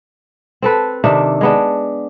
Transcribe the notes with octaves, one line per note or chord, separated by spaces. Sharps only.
C4 A4 B4
C3 D#3 D4 E5
G#3 B3 D4